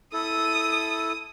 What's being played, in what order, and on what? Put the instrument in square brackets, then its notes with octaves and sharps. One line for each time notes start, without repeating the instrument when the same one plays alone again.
[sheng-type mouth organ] E4 A4 [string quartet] D#6